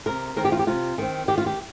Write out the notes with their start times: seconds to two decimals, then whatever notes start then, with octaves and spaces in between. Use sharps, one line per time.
0.06 C3 A#4
0.36 D#3 C4 A#4
0.45 G4
0.52 F4
0.59 G4
0.67 C3 F4
0.98 D#3 C4
1.28 D#3 G4
1.38 F4
1.46 G4